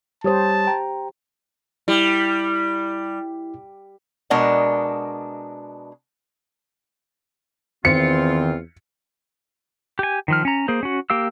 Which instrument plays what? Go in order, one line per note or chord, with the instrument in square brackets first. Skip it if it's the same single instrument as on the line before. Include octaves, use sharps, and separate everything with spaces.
[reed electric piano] G3 C#5 D#6 [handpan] G4 C5 [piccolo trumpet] A5
[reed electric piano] G5 A#5
[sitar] G3 [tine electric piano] E4
[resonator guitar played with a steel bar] B2 G#3 D4 A#4 D#5 F#5
[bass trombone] E2 [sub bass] D#3 [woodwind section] C4 F4 [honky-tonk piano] C#7
[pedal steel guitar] G4 G#5
D#3 F3 F6
C#4 A#5
A#3 G#4 C5
C#4 F#4
A#3 G4 F5 E6